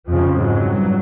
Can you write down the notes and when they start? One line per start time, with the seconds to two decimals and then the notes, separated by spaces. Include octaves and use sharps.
0.08 F2 C#3 F3
0.36 G#2 F#3
0.66 G2